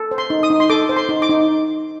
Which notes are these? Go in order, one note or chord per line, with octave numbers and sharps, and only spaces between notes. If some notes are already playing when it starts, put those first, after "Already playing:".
Already playing: A4
C5
C6
D#4
D#6
D#4
C6
A4 D6
C5
C6
D#4
D6
D#4